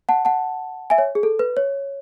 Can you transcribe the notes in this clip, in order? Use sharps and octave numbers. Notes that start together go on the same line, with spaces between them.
F#5 A5
F#5 A5
E5 G#5
C#5
G#4
A4
B4
C#5